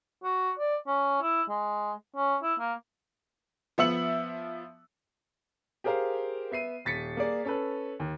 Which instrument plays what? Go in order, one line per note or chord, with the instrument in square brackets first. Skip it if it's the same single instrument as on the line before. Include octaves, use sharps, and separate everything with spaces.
[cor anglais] F#4
D5
C#4
E4
G#3
C#4
E4
A#3
[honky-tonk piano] F3 B3 E5 E6 C#7 F#7
[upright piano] G4 G#4 A#4 C5 F5
B3 E5 C7 D#7
D#1 A6 B6 C#7
A#3 G#4 D5
C#4 A4 B4
D#2